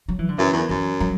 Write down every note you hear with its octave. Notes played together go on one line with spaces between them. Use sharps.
F#3
E3
D3
F#2 E3
E2
F#2 E3
F#3